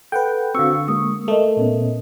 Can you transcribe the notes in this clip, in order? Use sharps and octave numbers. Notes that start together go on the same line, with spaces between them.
A4 B4 F#5 G5
D3 C4 F#4 F5 C#6 E6
G#3 A#3 D#6
A3 A4 A#4 D#5
A#2 B3 C#4